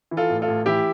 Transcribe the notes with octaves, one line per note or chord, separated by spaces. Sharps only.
E3
F4 A4
A1
F4 A4
A1
E3 E4 G4